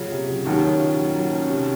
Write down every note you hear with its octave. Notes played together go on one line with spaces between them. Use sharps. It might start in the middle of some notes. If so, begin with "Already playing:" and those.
Already playing: C#3 F#3 C#4 F4
C3
F#3
D#2 D#3 F#3
C#4
F4
F#3
F#3
C#4
C3